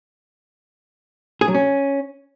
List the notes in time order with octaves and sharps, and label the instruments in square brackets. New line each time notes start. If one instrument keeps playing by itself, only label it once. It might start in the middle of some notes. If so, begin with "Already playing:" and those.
[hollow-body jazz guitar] G#4
F#3
C#4